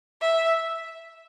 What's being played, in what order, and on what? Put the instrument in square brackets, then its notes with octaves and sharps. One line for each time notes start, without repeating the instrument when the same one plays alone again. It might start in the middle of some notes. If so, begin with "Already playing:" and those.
[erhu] E5